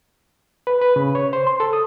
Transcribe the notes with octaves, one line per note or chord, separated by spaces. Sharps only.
B4
B4
C#3
C#5
C5
C6
A4
D#6